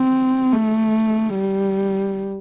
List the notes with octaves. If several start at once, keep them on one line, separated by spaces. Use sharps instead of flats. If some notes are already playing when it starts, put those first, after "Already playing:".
Already playing: C4
A3
G3